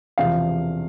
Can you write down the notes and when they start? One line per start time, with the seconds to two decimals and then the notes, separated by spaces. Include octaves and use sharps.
0.18 E1 E2 C3 F3 F5